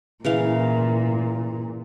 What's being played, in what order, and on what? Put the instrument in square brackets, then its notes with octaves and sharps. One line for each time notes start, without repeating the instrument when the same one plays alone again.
[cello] A#2 [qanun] C#3 E3 F5